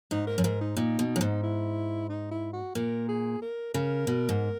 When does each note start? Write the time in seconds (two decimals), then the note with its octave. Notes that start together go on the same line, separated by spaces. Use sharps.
0.11 G#2 D#4
0.27 A#4
0.38 F#2
0.44 G#2 A#4
0.61 D#4
0.77 A#2 D#4
0.99 B2
1.16 F#2
1.21 G#2
1.43 E4
2.09 D#4
2.31 E4
2.53 F#4
2.75 A#2 A#4
3.08 G#4
3.42 A#4
3.74 C#3 A#4
4.07 B2
4.29 G#2